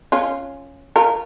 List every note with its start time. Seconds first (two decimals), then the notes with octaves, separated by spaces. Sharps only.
0.12 C#4 F4
0.96 F4 A#4